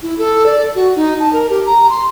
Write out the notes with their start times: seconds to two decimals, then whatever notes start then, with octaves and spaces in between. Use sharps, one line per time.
0.02 E4
0.18 A4
0.46 D5
0.75 F#4
0.96 D#4
1.20 A5
1.33 A#4
1.50 G4
1.66 A#5
1.89 C6